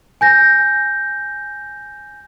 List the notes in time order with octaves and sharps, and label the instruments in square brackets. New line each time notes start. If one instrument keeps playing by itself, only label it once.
[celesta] G#5 G6 A#6